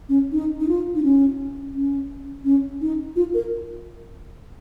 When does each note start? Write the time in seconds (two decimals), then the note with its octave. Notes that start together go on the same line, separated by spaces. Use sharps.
0.09 C#4
0.32 D#4
0.60 D#4
0.68 F4
0.95 D#4
1.03 C#4
1.75 C#4
2.45 C#4
2.81 D#4
3.16 F4
3.34 A#4